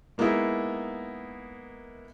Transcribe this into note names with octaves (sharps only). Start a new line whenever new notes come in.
G#3 A#3 B3 D#4 E4